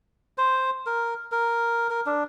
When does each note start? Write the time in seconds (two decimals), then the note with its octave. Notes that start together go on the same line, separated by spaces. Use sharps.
0.38 C5
0.86 A#4
1.32 A#4
1.90 A#4
2.06 D4